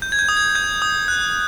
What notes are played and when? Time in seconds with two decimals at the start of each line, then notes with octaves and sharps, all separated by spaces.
0.02 G6
0.12 G#6
0.19 G6
0.29 D#6
0.37 G#6
0.55 G6
0.82 D#6
1.08 F#6